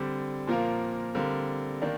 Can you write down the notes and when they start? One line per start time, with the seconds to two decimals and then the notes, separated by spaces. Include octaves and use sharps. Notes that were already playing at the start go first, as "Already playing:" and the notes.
Already playing: D3 G3 C4
0.47 A#2 F3 A#3 F4 A#4
1.15 D3 G3 C4 F4 A#4
1.82 D#3 A#3 D4